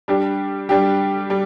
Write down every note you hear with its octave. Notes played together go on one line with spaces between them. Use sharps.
G3 D4 G4
G3 D4 G4
G3